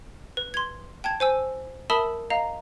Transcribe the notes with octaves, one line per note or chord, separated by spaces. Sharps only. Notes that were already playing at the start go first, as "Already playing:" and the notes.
B4
C6 G#6
G5 A5 G#6
C5 G#5 E6
A#4 E5 A5 B5 D#6 E6
D#5 F5 A#5